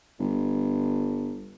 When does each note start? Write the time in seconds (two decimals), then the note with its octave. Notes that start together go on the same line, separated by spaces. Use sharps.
0.20 G1